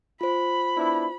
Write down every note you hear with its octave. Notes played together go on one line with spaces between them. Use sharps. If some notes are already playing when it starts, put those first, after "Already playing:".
F4 C5 B5
B3 D4 E4